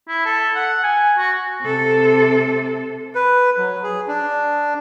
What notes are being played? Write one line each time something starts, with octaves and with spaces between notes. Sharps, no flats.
E4
A4
F#5
G#5
F#4
C3 A4
B4
F#3
G#4
D4